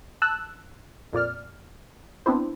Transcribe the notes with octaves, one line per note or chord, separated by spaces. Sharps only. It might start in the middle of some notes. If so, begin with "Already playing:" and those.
A5 E6 F#6
F2 A#2 D5 F6
B3 C4 D4 E4 C5